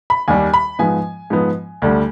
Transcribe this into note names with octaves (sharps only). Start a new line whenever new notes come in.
B5
D#2 D#3 G3 G#5
B5
G#2 F3 B3 G#5
G#2 F3 B3
D2 D3 G3